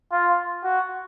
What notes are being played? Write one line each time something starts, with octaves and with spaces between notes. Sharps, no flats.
F4
F#4